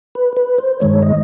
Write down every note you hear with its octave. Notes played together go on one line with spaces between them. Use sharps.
B4
B4
C5
G2 D#3 G#3 C#5
D#5